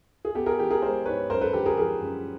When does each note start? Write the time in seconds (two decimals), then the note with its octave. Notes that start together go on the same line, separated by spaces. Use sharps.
0.25 G#4
0.35 B3 G4 A4
0.46 G#4 A#4
0.59 E3 G4 A4
0.71 G#4 A#4
0.82 G#3 A#4 C5
1.06 G#2 B4 C#5
1.30 F#2 A#4 C5
1.41 A4 B4
1.53 D3 G4 A4
1.66 G#4 A#4
1.77 F3 G#4 A#4
2.01 F#2